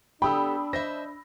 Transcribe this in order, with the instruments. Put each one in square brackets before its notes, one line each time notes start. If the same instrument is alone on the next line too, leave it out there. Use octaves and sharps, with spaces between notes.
[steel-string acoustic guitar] B3 G4 A4 [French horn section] D4 [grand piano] G5 [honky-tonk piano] B5 D#6 E6
[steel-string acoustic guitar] C5 D#5 E5 [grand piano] A#6